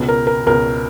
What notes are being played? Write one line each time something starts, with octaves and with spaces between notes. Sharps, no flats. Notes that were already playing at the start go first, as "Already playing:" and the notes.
Already playing: C#2 B2
A#4
A#4
C#2 B2 A#4